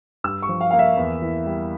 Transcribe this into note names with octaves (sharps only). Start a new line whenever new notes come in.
G2 E6
C#6
F3
F5
A#3 F5
E5
E2
E3
G3